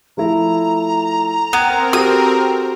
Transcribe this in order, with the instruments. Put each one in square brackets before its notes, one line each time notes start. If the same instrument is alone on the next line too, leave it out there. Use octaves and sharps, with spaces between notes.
[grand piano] F3 A3 E4 [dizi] A#5
[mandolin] B3 [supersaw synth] C4 A#4 [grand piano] G5 G#6
[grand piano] F#4 G4 A4 [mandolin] D#6